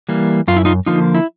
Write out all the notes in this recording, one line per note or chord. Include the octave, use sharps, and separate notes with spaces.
E3 G3 A#3
F#2 F4
E4
D#4 F4
D3 F3 A#3 D#4 F4
E4